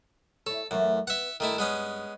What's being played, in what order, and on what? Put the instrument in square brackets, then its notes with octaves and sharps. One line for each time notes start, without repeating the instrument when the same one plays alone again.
[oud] E4 C#5 [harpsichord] A4
[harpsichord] F#2 [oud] E3 A3 E4
[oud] B3 [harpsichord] E5 F#5
[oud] G2 D#5 [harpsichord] D#3 A3 E4
[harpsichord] G#3 B3 C#4